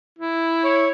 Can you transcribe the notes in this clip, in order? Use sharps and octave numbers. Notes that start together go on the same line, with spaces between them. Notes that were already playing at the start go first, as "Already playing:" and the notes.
E4
C#5